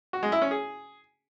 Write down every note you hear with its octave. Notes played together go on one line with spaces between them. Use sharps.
F#4
G#3
E4
C#4
G#4